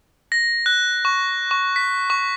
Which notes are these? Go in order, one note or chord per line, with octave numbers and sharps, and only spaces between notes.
A#6
F#6
C#6
C#6
B6
C#6